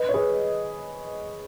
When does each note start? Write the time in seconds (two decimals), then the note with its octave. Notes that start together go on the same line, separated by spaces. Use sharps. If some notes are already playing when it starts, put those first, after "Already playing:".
Already playing: B4 D#5
0.09 C#5
0.14 G#4 B4